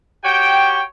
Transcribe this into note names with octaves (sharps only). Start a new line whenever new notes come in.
F#4 G4 C#5 G5